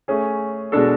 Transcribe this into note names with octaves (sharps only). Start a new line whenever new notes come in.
A3 C#4 G#4
B2 G#3 D4 A4